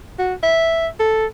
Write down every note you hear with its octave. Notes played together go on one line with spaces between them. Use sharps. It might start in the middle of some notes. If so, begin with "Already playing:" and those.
F#4
E5
A4